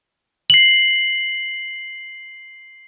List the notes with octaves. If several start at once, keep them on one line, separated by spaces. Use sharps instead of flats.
C7 F#7